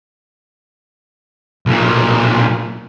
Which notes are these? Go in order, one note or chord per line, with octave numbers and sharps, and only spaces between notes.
B1 A#2